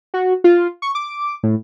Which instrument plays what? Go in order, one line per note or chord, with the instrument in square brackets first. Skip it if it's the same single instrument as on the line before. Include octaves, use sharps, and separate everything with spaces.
[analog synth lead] F#4
F4
C#6
D6
A2